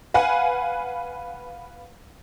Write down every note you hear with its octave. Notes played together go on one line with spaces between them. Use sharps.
B4 F5 F#5 G#5